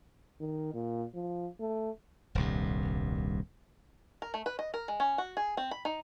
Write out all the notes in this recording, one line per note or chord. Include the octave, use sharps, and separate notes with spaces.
D#3
A#2
F3
A3
D#1 C2 G2
A#4
A3
B4
D#5
A#4
G#3
C#4
F#4
G#4
C4
B5
D#4